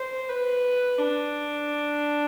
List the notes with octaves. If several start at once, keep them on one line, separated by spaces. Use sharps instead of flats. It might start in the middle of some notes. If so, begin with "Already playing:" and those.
Already playing: C5
B4
D4